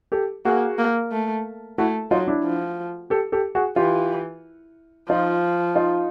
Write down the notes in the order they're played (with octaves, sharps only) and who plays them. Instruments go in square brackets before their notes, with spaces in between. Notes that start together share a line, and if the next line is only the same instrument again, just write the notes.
[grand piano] G4 A4
[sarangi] A#3 [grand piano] F#4 G#4
[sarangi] A#3
A3
[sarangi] A3 [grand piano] E4 F#4
[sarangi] F#3 [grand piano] D#4 F4
[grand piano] D4 E4
[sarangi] F3
[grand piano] G4 A4
G4 A4
F#4 G#4
[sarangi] E3 [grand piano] F4 G4
[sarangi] F3 [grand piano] D#4 F4
[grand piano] D#4 F4